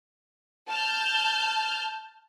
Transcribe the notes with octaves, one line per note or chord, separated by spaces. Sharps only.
A5 F6 G6